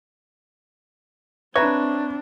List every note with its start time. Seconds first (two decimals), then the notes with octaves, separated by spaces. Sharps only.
1.56 C4 D4 B4 C#5 E5 A#5